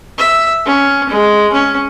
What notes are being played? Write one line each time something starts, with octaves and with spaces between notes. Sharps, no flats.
E5
C#4
G#3
C#4